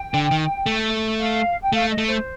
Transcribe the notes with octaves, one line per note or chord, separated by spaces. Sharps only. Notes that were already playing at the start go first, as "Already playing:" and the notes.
Already playing: G5
D3
D#3
A3
F5
G5
A3 F5
D#5
A3
C5